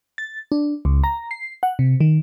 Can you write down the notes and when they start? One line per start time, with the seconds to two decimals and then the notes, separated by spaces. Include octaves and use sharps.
0.18 A6
0.52 D4
0.85 C#2
1.04 A#5
1.31 C7
1.63 F#5
1.79 C3
2.01 D#3